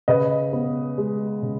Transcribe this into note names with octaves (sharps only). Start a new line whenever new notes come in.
C#3 B4 D#5
B3
G#3
C#3